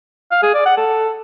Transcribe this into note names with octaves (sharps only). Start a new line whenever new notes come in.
F5
G#4
D5
F#5
A4